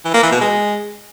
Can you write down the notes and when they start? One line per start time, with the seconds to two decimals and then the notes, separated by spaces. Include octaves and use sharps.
0.05 E3
0.14 A#3
0.23 E3
0.32 B2
0.41 G#3